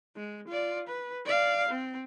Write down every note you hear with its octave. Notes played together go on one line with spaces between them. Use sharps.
G#3
F4 D5
B4
D5 F5
C4